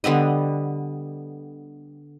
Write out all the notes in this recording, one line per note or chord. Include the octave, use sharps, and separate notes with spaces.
D3 G3 B3 D#5